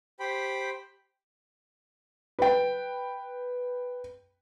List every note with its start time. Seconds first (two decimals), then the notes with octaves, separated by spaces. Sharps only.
0.20 G4 C5 G5 B5
2.39 B4 G5